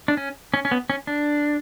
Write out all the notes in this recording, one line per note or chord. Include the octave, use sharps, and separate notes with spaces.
D4
C#4
C#4
C#4
B3
C#4
D4